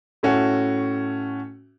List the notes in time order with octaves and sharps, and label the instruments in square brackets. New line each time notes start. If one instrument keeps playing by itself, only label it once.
[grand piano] A2 A3 C#4 F#4